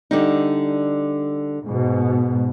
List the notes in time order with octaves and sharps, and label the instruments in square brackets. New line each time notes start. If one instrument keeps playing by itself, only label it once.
[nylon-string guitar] D3 G3 D#4
[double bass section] G#2 B2